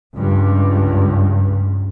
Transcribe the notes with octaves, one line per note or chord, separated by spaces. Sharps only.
C#2 G2